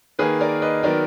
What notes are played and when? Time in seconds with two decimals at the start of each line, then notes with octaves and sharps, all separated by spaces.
0.19 D#3 A#3 G#4 B4
0.41 A#4 D5
0.62 B4 D#5
0.83 D#3 F#3 B3 A#4 D5